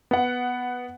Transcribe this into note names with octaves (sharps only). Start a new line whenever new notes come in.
B3 F#5